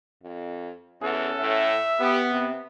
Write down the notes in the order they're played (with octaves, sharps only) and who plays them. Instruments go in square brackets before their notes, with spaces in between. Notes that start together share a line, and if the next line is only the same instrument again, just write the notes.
[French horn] F2
[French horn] E2 [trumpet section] C#4 A4 F#5
[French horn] A2 [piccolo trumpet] E5
[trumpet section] B3 [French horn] G4
[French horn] C3